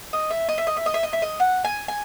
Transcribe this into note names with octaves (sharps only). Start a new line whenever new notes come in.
D#5
E5
D#5
E5
D#5
E5
D#5
E5
D#5
E5
D#5
F#5
G#5
G#5